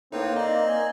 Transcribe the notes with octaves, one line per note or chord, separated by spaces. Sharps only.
A2 A#3 C4 D#4 B4 C#5
D#4 D5 D#5
G#5